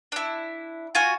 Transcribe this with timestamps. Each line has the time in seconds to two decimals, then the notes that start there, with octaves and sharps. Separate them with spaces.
0.12 D4 E4
0.95 F4 F#4 G#5